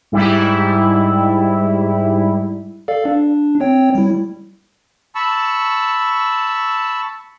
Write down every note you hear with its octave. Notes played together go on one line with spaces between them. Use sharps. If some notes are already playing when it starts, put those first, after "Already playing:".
G#2 G3 E4
A4 D5 F5
D4
C4 C#5 G5
G3 E4
A5 B5 C#6 E6